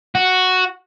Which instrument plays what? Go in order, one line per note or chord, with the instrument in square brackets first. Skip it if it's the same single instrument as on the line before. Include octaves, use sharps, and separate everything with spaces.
[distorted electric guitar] F#4